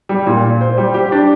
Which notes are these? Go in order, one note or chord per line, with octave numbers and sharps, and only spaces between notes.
G3
A#2
A#2
C5
G3
G4
D4